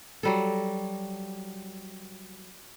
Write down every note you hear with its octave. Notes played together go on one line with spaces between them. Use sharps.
F#3 G3 A4